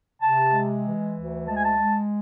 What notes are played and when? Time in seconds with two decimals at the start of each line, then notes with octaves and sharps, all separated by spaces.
0.22 C3 A5
0.52 G#3
0.84 E3
1.15 D2
1.47 G#3 A5
1.56 G#5
1.64 A5
1.79 G#3